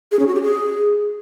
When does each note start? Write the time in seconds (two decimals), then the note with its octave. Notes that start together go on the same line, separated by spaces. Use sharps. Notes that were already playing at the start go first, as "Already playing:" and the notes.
0.12 G#4
0.19 C#4
0.27 F#4
0.35 G4
0.43 G#4